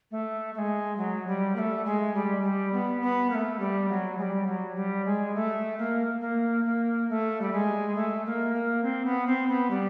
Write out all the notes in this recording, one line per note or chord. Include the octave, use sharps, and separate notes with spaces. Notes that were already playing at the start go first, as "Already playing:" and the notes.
A3
A3
G#3
F#3
G3
A#3
A3
G#3
G3
G3
B3
B3
A#3
A3
G3
F#3
G#3
G3
F#3
G3
G#3
A3
A#3
A#3
A#3
A3
G3
G#3
A3
A#3
A#3
C4
B3
C4
B3
G3